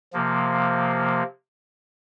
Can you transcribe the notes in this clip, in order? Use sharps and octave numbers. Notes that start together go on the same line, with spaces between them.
C3 F3 A#3